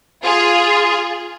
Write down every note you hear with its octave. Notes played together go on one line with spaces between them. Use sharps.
F4 G#4